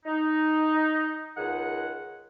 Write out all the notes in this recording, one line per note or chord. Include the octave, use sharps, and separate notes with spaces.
D#4
C#2 D#3 G#4 F#5